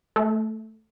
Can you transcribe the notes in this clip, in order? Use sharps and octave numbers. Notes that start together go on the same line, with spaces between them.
A3